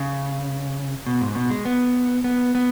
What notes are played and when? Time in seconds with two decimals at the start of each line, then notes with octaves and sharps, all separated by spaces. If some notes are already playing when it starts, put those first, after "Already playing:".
Already playing: C#3
1.07 B2
1.21 G#2
1.35 B2
1.50 G#3
1.65 B3
2.24 B3
2.55 B3